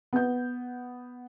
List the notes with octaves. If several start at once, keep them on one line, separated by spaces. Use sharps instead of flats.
B3 G6